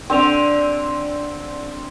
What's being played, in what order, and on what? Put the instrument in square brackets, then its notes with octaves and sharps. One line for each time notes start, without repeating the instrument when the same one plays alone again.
[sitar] D3 [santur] C4 [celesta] D4 D5 F7